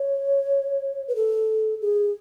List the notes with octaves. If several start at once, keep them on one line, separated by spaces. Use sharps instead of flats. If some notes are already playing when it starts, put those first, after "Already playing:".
Already playing: C#5
B4
A4
G#4